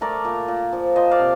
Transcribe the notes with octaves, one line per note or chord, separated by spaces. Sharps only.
A3 A#4 D5
A#2
A#2
F3
F3 C5 D#5
D5 F5
C3